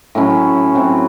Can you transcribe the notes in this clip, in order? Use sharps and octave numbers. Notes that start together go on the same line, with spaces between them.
A2 F#3 C#4 E4
F#3 C4 E4